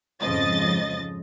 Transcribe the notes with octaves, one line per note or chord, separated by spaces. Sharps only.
F2 G#2 C#3 F3 D#5 A6